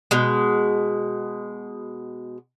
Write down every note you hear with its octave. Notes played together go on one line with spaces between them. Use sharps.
B2 G#3